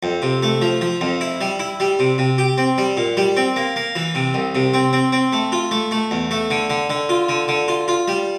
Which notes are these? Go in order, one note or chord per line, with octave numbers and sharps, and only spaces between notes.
F2
C3
A3
F3
F3
F2
E4
G3
E4
G3
C3
C3
G4
C4
G3
A#2
G3
C4
A#3
A#3
E3
C3
C2
C3
C4
C4
C4
A3
F4
A3
A3
E2
A3
D3
D3
D3
F4
D3
D3
F4
F4
G3